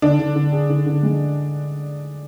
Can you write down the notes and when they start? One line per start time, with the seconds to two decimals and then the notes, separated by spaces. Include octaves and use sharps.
0.02 D3 D4
0.19 D3
0.36 D3
0.52 G#4
0.69 D3
0.86 D3
1.03 G#3